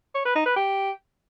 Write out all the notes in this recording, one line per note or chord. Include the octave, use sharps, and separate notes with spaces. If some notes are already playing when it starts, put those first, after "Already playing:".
C#5
B4
D#4
B4
G4